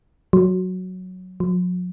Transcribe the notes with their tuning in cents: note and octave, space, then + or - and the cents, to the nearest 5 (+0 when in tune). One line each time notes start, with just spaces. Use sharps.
F#3 -5
F#3 -45